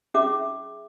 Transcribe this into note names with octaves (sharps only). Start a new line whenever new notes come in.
C#4 G#4 E5 D6